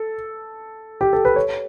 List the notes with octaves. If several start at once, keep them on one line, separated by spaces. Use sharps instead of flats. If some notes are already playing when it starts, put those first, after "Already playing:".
Already playing: A4
G4
A4
B4
C#5